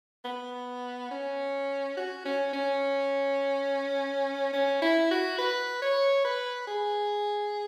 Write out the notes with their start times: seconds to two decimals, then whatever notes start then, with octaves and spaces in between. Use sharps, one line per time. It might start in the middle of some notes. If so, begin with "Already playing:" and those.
0.25 B3
1.11 C#4
1.97 F#4
2.26 C#4
2.53 C#4
4.53 C#4
4.82 E4
5.11 F#4
5.38 B4
5.82 C#5
6.25 B4
6.67 G#4